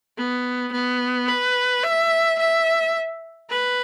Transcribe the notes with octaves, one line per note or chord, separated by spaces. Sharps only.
B3
B3
B4
E5
E5
B4